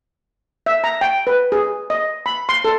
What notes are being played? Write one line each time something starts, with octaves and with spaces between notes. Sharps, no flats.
E5
A#5
G5
B4
G#4
D#5
B5
C6
A4